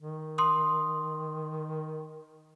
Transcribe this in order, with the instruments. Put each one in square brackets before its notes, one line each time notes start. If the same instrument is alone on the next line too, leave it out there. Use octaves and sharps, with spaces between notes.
[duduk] D#3
[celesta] C6 D#6